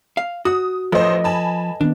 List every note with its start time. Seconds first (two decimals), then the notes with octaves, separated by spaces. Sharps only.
0.17 F5
0.45 F#4 D#6
0.92 A1 F3 A4 B4 C5 D#5
1.24 G#5 A5 B5
1.81 D#3 B3 D4